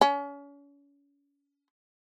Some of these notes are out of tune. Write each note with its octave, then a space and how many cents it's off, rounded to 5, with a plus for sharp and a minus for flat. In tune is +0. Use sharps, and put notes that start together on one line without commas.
C#4 +35